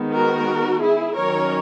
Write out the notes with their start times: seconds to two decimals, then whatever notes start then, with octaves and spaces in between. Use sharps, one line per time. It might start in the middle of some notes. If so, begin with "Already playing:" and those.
Already playing: D#3 G#3 B3
0.14 F#4 A#4
0.82 E4 G#4
1.14 D#3 F#3 C#4 A#4 C#5